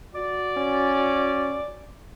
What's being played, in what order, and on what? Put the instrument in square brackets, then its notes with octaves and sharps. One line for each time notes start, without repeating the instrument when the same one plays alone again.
[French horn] F#4 [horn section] D5
[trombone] C#4